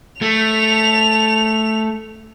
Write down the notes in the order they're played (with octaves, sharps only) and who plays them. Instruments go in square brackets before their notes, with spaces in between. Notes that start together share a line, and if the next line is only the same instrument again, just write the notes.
[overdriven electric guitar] A3 [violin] F7